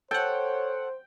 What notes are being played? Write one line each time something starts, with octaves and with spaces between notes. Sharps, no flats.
A4 C5 C#5 F#5 G5